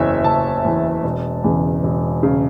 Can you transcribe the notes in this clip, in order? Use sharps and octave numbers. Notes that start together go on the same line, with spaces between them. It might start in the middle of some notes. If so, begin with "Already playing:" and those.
Already playing: F#1 E2 E3 C#5 E5
F#1 A5
E2 E3
E1
E2 C#3
E1
C#3